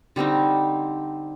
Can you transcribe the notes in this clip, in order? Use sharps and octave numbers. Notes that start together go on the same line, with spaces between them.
D3 G3 C4 D#4